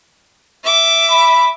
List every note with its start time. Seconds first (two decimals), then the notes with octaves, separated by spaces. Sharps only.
0.64 E5 D6
1.11 B5